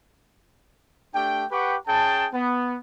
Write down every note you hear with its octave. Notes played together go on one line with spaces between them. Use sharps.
A3 D4 G4 G5
G4 B4 F#5 G5 C#6 D6
C#4 G#4 G5 A5
B3